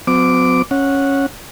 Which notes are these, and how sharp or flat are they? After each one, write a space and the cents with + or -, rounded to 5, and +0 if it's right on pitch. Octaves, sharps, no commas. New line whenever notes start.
F#3 -30 C4 -40 D6 +0
C#4 -5 F#5 -10